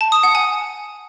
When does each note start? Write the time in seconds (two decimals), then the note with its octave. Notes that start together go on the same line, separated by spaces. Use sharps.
0.01 A5
0.12 D#6
0.23 F#5
0.35 G#5